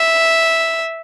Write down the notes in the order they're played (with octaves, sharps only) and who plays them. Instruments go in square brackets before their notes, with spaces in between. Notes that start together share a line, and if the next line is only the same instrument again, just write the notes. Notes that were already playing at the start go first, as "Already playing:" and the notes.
Already playing: [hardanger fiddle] E5